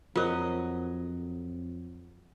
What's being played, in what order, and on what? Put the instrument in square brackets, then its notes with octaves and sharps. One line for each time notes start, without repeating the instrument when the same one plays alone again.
[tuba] F2 [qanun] F#3 D#5 [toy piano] F4 A#4 C5